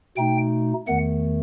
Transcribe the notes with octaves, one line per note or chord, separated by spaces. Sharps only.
B2 A3 D#4 G5
E2 D#3 A3 F#5